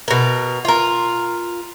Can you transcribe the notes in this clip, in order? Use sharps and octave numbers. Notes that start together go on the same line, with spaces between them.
B2 A#4
F4 A#4